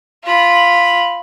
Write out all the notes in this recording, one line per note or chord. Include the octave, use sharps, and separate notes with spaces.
F4 B5